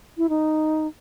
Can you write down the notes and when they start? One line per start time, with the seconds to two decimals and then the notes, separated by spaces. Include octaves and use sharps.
0.18 E4
0.29 D#4